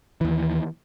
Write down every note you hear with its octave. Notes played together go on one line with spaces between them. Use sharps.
D#2 E3